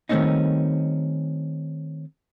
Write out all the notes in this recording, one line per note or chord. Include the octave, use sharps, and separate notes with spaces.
D#3 G3 A3 C4 C#4 D#4